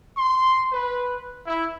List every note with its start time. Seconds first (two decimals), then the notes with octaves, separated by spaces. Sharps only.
0.16 C6
0.72 B4
1.46 E4